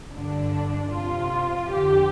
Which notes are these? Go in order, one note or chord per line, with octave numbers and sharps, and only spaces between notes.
G2 D3 D4
F2 C3 F4
F2 D3 G4